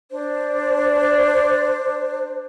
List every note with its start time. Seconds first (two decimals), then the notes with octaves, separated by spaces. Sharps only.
0.11 D4 C5